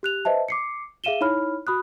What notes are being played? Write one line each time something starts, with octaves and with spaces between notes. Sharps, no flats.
G4 F#6 F7
B4 C5 D#5 E5 A5
D6 C7 C#7
G#4 E5 F5 D#7 E7 G7
D#4 E4 C#5 B5 F6
F#4 B5 D#6 F#6